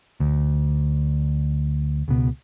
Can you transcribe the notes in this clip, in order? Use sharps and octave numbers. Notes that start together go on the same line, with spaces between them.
D2
C#2 B2